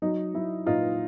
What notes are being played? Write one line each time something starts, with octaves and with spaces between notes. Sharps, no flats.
F#3 D#4
F#3 E4
A#2 D#4 F4